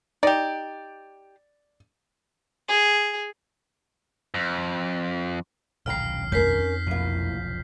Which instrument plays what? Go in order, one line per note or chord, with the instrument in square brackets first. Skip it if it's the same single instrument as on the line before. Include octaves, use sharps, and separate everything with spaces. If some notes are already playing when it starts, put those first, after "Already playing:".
[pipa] D#4 G4 [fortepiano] D5
[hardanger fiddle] G#4
[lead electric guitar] F2
[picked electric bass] D#1 B1 [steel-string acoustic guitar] C#3 G5 A#5 [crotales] F6 C7
[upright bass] F2 D#4 [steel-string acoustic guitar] C#4 A#4 [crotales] G6 B6 C7
[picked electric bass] F1 B1 F3 [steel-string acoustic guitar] A2 A#3